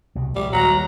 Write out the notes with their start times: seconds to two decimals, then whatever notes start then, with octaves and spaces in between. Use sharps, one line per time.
0.15 C2 B2
0.35 A#1 G3 G#3
0.53 D#2 F#3 G3 A#5